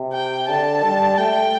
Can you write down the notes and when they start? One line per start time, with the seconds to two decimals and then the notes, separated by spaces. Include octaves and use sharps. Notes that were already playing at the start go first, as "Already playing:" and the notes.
Already playing: C3
0.13 G5
0.48 D3 A5
0.83 G3
1.18 A3 G5